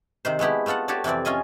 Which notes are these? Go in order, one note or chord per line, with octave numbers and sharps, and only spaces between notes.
C3 D#3 C5
G#3 A3 B3 E4 G4
A3 B3 F4 A4 F#5
F#4 G4 A4 C#5 D5
F2 C3 E3 C4 D5
C#4 F4 D#5 G#5